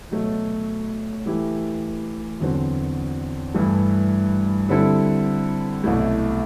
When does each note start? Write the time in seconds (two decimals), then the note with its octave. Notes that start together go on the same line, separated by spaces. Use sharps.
0.11 B2 F#3 A3
1.26 E3 A3 E4 G4
2.41 E2 D3 F#3 C4
3.54 G2 E3 A3 E4
4.69 D3 G3 C4 E4 A4
5.84 C2 B2 F#3 A3 E4